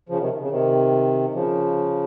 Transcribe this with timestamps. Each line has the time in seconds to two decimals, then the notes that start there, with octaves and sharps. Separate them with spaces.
0.09 C#3 F3
0.20 C3 D#3
0.40 C#3
0.51 C3 D#3
1.34 C#3 F3